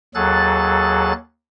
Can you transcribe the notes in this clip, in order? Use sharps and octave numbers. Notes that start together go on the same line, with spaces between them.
D#2 F#3 G#4 A4 F#6 A6